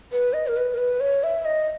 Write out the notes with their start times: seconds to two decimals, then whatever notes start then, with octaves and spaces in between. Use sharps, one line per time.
0.12 B4
0.33 D#5
0.47 A#4
0.57 B4
0.74 A#4
0.78 B4
1.00 C#5
1.23 E5
1.45 D#5